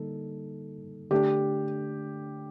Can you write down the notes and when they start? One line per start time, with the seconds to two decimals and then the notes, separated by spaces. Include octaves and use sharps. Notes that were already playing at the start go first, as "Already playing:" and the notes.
Already playing: D3 G3 A#3 D#4 A4
1.11 D3 A3 D4 G4